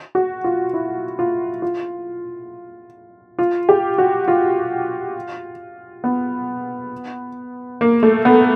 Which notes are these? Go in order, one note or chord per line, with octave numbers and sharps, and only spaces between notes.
F#4
F4
E4
F4
F4
F4
G4
F#4
F4
B3
A#3
A3
B3